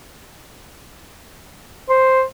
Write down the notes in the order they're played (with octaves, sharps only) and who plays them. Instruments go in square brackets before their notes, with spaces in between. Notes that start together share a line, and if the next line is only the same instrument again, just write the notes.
[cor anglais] C5